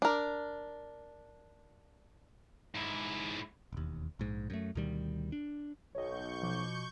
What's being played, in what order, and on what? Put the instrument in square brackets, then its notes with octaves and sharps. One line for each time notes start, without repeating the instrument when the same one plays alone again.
[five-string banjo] D4 A#4
[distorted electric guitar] G#2 E4
[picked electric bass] E1 D#2
A#1 G#2
F#2 A3
D2 B2 D#3 G3
D4
[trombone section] B1 [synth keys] C#5 D#5 [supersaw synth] C#6 G6
[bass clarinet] B2 [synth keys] F3 D6